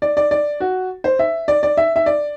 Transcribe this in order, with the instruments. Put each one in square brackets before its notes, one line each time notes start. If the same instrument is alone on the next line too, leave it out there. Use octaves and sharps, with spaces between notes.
[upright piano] D5
D5
D5
F#4
C5
E5
D5
D5
E5
E5
D5